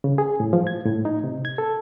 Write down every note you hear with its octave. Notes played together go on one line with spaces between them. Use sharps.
C#3
G#4
A2
F3
G#6
A2
D#4
C3
G#6
A4